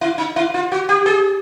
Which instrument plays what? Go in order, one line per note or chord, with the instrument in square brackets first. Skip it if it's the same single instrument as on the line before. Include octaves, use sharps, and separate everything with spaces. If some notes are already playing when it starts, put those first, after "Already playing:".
[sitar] E4
D#4
E4
F4
F#4
G4
G#4